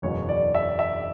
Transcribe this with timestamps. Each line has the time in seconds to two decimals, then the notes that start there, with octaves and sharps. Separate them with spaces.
0.02 F#1 E2 B2 C#5
0.29 D5
0.55 E5
0.79 E5